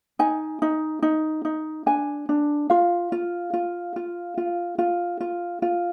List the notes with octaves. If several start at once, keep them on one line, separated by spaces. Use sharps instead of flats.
D#4 G#5
D#4
D#4
D#4
D4 G#5
D4
F4 F5
F4
F4
F4
F4
F4
F4
F4